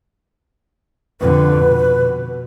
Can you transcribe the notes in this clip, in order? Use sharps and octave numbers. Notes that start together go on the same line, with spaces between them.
F2 D3 B4
B2